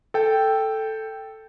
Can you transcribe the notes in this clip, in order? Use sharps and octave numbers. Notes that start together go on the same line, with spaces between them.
A4 G5